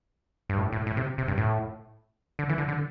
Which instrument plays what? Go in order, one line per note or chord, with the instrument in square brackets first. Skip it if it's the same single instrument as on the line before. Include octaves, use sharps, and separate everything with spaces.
[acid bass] G2
A2
A2
A2
C3
C3
G2
A2
D3
E3
D3
D3